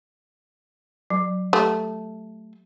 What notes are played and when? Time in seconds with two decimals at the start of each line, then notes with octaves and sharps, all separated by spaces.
1.10 F#3
1.53 A3 G4